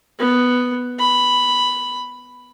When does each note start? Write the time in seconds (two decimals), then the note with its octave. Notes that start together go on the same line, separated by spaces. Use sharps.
0.19 B3
0.99 B5